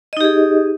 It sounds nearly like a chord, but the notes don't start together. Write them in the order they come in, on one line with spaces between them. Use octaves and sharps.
D#5 D#4 G4 G#4